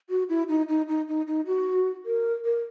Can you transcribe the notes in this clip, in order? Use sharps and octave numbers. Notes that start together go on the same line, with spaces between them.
F#4
E4
D#4
D#4
D#4
D#4
D#4
F#4
A#4
A#4